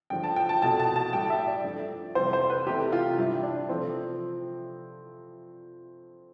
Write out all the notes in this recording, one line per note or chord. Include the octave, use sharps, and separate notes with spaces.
G2 D3 F3 G5
A5
G5
A5
C2 B2 A3 A5
A5
A5
A2 G3 G5
E5
D5
G2 F3 A3
F2 C3 E3 G3 C5
C5
B4
C2 C3 E3 A3 G4
F4
G2 E3 G3 E4
D4
C3 F3 A3 C4